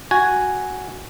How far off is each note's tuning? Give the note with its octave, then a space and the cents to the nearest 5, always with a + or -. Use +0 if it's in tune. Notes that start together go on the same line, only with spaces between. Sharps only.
F#4 +0 G#5 +0